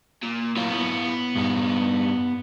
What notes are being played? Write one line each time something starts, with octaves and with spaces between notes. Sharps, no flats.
A#2
A#2 E4 C#5 F5
B3
G2 D#4